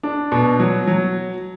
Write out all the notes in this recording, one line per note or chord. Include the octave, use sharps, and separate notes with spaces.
D4
B2
F#3
F#3